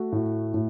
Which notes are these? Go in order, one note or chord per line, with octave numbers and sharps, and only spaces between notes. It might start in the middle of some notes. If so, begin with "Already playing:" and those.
Already playing: A3 F#4
A2
A2